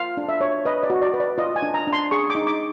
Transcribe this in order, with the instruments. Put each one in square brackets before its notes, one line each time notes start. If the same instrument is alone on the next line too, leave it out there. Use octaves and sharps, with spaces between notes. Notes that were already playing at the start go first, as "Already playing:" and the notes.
Already playing: [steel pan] F4 F5
D4
E5
C#5
B4 D#5
D5
F#4
D5
B4
D5
F4 D#5
G#5
D4
A#5
D4
C6
G#4 C#6
D6
D#4
D6